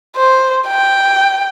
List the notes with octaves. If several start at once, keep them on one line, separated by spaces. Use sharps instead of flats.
C5
G5